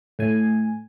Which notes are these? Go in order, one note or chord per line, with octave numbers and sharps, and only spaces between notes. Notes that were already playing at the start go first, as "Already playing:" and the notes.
A2 G#5